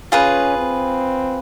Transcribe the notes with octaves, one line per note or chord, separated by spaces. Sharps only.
C#4 F4 G#4 B4
C4